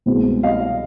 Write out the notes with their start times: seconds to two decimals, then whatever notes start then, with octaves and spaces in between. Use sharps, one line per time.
0.06 C2 B2 G#3 C4
0.43 D#5 F5